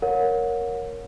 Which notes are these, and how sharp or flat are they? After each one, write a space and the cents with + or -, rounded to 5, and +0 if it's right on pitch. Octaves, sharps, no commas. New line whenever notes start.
A#4 +0 C#5 +0 F#5 -40